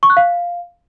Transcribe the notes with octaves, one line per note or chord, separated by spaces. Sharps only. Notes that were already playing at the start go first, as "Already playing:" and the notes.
C#6
F#6
F5